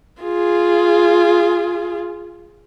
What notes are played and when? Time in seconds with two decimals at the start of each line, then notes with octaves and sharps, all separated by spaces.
0.22 F4 G#4